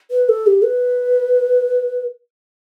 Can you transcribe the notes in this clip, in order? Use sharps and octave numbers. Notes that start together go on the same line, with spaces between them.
B4
A4
G4
B4